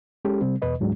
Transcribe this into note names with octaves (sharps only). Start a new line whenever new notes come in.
G#3 C#4 G4 A4
C3 G3 C4
E2 B2 B4 D#5
D2 G#2 F#3 G#3 D4